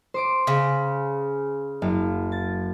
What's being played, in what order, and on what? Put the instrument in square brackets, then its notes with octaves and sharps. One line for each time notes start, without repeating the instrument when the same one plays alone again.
[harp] C5 D6 D7
[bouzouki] C#3
[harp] F#1 F5
A6